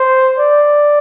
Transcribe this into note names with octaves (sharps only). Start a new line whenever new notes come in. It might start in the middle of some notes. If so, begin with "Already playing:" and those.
Already playing: C5
D5